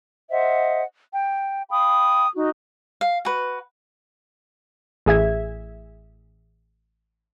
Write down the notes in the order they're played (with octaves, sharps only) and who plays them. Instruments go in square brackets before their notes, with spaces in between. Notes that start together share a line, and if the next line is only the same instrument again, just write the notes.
[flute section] C5 D#5 E5 F#5
G5
F5 G5 B5 D#6
D#4 F#4
[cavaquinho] F5
F#4 B4
[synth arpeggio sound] A1 G#4 E5 G#6